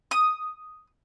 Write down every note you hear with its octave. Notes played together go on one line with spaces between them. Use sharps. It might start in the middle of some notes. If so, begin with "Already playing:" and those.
D#6